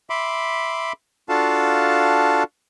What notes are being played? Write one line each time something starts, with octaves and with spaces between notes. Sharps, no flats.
E5 B5 C6 D6
D4 F4 F#4 A4 F5 A5